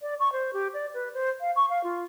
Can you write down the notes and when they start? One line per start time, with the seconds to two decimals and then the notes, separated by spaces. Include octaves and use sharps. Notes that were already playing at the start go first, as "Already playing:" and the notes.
0.01 D5
0.20 C#6
0.33 C5
0.53 G4
0.74 D5
0.94 B4
1.14 C5
1.41 F5
1.56 C#6
1.70 F5
1.84 F4